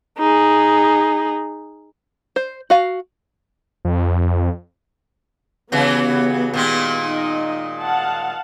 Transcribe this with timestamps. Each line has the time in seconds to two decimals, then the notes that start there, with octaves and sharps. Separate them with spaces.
0.19 D#4 G#4
2.36 C5
2.70 F#4 F5
3.85 F2
5.72 C#3 E3 F#3 B3 G4
6.54 A#2 D#3 G#3
7.02 D#4 D#5
7.81 F5 F#5 A5